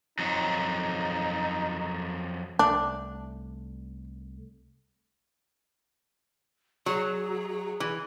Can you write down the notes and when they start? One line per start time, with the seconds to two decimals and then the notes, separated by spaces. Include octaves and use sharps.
0.19 F2 F#3 D#4
2.59 C2 A3 D4
6.86 F#3 G#4
7.80 E3